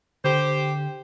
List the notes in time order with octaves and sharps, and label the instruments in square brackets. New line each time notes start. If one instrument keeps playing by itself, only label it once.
[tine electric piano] D3 [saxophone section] G4 C5